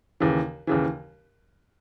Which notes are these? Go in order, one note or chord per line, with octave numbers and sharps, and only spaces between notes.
D#2 C#3 E3
D#2 C#3 E3